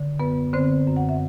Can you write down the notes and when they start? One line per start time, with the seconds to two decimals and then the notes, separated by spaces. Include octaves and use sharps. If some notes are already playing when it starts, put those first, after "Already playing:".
Already playing: D3
0.20 F#2 B3 B4
0.54 D3 C4 C5
0.87 F#2
0.96 F#5
1.09 E5